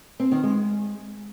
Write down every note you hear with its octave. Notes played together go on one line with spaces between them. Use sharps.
C4
D#3
G#3